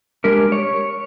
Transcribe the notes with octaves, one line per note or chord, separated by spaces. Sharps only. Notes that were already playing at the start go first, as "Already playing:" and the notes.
G#3 D4 G4 A#4
C#5